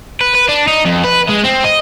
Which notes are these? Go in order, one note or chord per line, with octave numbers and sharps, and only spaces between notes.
B4
B4
D4
D#4
F2
B4
G#3
C4
D#5